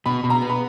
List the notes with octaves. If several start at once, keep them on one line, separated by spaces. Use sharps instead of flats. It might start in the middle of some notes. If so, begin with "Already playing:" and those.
B2 B5
B2 B5
A#5
B3
B5